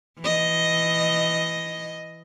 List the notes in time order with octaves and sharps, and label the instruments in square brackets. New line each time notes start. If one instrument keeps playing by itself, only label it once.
[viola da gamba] E3 D#5